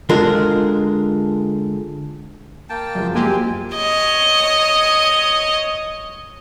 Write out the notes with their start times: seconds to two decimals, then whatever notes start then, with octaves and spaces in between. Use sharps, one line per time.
0.09 D3 G#3 F4 A#4
2.70 A#3 G5 A5
2.95 F#2 C#3 F3
3.15 G#3 A#3 C4 G4 G#5
3.76 C#5 D#5